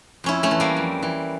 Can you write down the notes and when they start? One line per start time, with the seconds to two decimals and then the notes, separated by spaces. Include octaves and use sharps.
0.24 F2 C#4 E4
0.43 A3 C#4
0.51 E3
0.60 G3 A#3
0.76 F2
1.03 E3